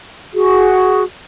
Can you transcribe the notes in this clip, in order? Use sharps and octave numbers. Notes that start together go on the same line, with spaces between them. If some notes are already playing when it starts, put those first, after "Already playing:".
F#4 G#4